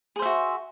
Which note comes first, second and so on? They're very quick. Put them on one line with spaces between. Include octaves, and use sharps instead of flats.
G#4 C5 E5 F#4